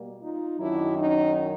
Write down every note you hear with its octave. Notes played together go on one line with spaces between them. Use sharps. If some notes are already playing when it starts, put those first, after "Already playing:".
Already playing: B2 G3 A#3
D#4 F4
F#2 D#3 F#3 D4 E4
C#4 D#4